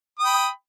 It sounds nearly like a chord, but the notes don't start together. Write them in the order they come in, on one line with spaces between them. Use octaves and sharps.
D#6 G5 B5